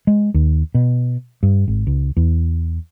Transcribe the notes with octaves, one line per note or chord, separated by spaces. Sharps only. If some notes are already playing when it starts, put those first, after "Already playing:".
G#3
D#2
B2
G2
G#1
C#2
E2